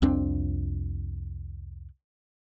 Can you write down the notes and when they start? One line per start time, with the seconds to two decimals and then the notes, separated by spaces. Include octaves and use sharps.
0.02 C2 F2 C4 D4